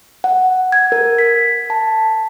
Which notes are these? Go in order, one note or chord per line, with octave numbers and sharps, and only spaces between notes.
F#5
G#6
A#4
B6
A5